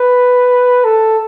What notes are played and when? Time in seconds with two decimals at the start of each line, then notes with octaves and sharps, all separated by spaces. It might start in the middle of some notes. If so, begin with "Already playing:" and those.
Already playing: B4
0.84 A4